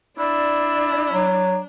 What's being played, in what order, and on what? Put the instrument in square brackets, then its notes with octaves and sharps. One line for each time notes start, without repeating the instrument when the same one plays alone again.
[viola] D4 [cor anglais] E4 [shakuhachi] D5
[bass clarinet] F#3